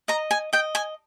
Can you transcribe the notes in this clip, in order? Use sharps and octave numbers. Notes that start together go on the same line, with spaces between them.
D#5 A#5
G#5
D#5 G5
G#5